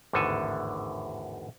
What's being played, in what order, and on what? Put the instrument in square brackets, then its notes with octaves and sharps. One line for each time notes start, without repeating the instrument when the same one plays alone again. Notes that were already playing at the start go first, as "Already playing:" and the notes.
[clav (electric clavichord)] G#1 E2 A2 D3 A4 G#5